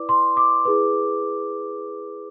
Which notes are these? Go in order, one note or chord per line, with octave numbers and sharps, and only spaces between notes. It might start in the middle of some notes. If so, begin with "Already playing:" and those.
Already playing: E4 B4 D5 D6
C6
D6
E4 G#4 B4